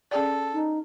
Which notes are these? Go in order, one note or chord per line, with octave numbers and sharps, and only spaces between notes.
C#4 G#4 A4 D5
D#4